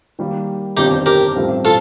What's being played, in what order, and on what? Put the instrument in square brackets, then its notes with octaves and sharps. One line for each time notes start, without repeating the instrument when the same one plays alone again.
[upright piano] D#3 G3 A#3
[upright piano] G1 F2 D#3 [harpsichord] D#4 G4
[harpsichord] G4 A#4
[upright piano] A1 G2 F3 A3 C4
[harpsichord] F4 A4